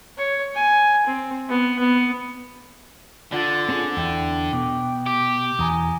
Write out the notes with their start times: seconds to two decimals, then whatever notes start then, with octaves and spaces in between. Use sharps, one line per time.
0.18 C#5
0.55 G#5
1.07 C4
1.49 B3
1.79 B3
3.32 D3 F4 D5 F#5 A6
3.69 C4 C#4 G#4
3.97 E2 D4 E4 G5
4.53 B2 D6
5.06 G4 D6
5.59 E2 G#5 A#5 D#6